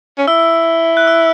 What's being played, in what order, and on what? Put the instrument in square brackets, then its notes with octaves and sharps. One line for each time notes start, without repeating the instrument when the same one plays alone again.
[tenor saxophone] C#4
[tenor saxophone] E4 [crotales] E6
[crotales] F#6
E6